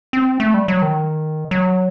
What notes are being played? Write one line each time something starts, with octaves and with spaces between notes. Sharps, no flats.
C4
A3
G3
F#3
D#3
F#3